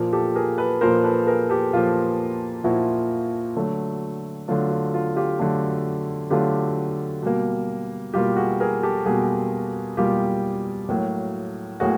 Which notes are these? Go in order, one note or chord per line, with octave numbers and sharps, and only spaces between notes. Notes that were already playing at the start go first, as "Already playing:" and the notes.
Already playing: A#2 F3 A#3
G4 A4
G#4 A#4
A4 B4
A#2 F3 A#3 A#4 C5
A4 B4
G#4 A#4
G4 A4
A#2 F3 A#3 F4
A#2 F3 A#3 E4 F#4
D3 F#3 A3
D3 F#3 A3 F4
F4
F4
F4 G4
D3 F#3 A3 F4
D3 F#3 A3 F4 G4
B2 G3 A#3
B2 G3 A#3 F4 G4
F#4 G#4
G#4 A#4
G4 A4
B2 G3 A#3 F#4 G#4
B2 G3 A#3 F4 G4
A2 F#3 A#3
A2 F#3 A#3 F#4 G#4